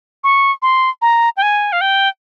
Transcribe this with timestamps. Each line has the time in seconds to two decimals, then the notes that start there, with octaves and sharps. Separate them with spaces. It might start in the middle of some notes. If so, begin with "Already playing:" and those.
0.24 C#6
0.62 C6
1.02 A#5
1.37 G5
1.42 G#5
1.72 F5
1.81 G5